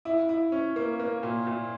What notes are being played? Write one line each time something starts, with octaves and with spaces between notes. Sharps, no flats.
E4
E4
C#4
A#3
A#3
A#2
A#2